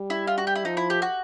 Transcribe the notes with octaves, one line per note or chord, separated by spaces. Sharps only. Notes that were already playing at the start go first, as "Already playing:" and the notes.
Already playing: G3
E4
F4
F#4
G4
E4
F3 D#4
E4
G4
F#4